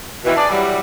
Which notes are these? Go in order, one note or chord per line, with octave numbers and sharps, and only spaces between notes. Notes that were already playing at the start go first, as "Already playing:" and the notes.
B2 D#3 E3
D4 G#4 D5
E3 F#3 G3